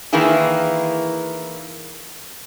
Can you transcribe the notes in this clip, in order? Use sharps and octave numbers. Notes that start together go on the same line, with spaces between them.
D#3 E3 A#3 E4 G#4